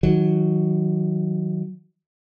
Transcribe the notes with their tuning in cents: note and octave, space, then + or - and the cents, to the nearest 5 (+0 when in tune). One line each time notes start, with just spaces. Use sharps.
D#3 +35 F#3 +0